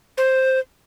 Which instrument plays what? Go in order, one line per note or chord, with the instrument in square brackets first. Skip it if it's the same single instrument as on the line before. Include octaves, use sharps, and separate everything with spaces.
[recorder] C5